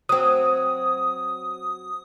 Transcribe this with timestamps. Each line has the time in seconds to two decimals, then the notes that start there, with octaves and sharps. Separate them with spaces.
0.09 F#3 C4 D#6